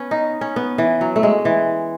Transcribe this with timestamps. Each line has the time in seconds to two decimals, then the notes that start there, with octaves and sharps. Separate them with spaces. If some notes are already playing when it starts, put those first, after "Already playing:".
Already playing: B3 C#4
0.11 D#4
0.41 C#4
0.56 B3
0.78 E3
1.01 F#3
1.16 A3
1.23 G#3
1.45 E3